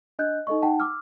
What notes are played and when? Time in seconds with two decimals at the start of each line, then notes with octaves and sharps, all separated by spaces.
0.19 D4 D#5 F#6 G6
0.47 D#4 A4 D#5 C#6
0.62 D#4 F#5 G5 A5
0.80 D6 E6 F6